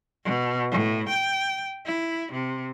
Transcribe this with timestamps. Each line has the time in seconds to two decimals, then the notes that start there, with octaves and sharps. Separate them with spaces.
0.23 B2
0.71 A2
1.08 G5
1.85 E4
2.31 C3